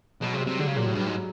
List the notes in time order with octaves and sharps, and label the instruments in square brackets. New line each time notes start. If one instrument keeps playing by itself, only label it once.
[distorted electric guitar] B2 [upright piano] F#3
[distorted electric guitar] C3 [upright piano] G#3
[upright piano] G3
[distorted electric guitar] C3
[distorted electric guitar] D3 [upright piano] G#3
[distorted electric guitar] C#3
[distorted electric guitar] A#2 [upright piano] F#3
[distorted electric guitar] A2
G2
G#2